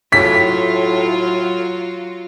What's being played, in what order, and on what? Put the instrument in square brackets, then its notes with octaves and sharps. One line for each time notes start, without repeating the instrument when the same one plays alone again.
[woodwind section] A2 [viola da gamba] F#3 F4 [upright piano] B6